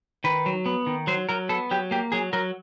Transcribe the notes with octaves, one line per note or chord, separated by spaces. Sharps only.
D#3 B4
F#3
B3
D#3
F#3 C5
F#3 A#4
B3 A4
F#3 G4
A#3 G4
F#3 G#4
F#3 A#4